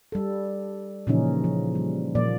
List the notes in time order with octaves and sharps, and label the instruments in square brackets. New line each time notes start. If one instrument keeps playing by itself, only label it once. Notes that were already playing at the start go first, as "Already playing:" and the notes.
[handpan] G3 A4
A#2 C#3 E3 F3 C#4 D#4
F3
G3
A#2 F3 A#3 D5